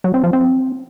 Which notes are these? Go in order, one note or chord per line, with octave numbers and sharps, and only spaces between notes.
F#3
C4
F3
C4